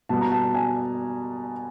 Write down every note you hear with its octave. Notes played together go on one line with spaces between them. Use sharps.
B2 G3 B3 A5
A#5
A5
G#5